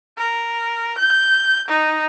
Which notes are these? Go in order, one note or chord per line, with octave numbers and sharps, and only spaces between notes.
A#4
G6
D#4